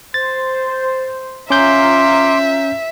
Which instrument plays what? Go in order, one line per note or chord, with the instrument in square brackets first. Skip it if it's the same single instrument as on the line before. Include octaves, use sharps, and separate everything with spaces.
[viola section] C5 [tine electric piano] A6
[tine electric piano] C#4 G6 [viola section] F4 F5 A#5 [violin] E5 [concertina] C6 D6